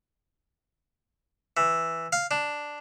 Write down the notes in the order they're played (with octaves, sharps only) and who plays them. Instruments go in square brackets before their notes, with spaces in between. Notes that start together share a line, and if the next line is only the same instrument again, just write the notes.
[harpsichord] E3
F5
D4